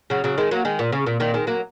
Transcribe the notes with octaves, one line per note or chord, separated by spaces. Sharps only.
C#3 F#3
C#3 F#3
D#3 G#3
F#3 A#3
D#3 G#3
A#2
C#3
A#2
A#2 D#3
D#3 G#3
F#3 A#3